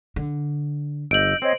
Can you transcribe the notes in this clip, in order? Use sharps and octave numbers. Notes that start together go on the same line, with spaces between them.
D3
G1 D#5 E6 G6 D7 F#7
C4 G#4 C5 C#5 D#5